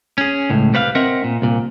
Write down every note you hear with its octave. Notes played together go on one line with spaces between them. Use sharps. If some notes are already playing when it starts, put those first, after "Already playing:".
C#4 G#4
C#2 A2
C2 G3 B4 C#5 F5
C4 A#4 D#5 E5 F#5
A#2
C2 A#2